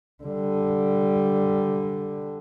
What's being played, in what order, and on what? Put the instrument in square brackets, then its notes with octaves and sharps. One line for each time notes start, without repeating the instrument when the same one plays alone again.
[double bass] D3 G3